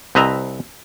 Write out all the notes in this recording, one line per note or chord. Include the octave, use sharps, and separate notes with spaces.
C2 C4 B4 D#5 E5 A#5